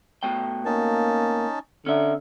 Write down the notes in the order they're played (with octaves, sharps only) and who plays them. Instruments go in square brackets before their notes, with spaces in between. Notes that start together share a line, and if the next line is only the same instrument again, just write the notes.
[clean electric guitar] B2 A3 G5
[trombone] A#3 [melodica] C#4 D#4 A5
[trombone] D3 [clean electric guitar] C#4 E5